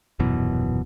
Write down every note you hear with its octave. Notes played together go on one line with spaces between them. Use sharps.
D#1 F#2 B2 E3